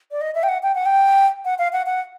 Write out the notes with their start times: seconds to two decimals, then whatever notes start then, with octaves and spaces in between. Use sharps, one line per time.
0.11 D5
0.21 D#5
0.35 E5
0.43 G5
0.49 F#5
0.63 G5
0.75 F#5
0.86 G5
1.45 F#5
1.59 F5
1.73 F#5
1.86 F#5